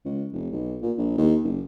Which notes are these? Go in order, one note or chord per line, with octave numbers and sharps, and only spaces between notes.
C#2
F1
B1
A#2
A#1
D#2
F#1